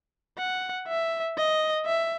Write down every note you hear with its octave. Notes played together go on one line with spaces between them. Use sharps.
F#5
E5
D#5
E5